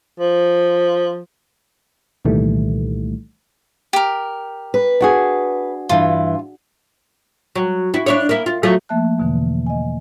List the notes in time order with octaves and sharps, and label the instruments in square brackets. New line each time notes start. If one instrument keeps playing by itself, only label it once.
[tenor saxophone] F3
[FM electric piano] C2 A#2 D#3 E3 G3 A3
[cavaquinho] G4 A#4
[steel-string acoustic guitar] B4
[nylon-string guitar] D4 F#4 G#4
[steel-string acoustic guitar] G2 E3 [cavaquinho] F4
[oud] F#3
E4 F#4
D4 E4 C#5
A#3 E4
F4
F3 F#3 A3
[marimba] F3 A3 A#3 E5 A5 F#6
E2 B2 D3 E3
D#5 G#5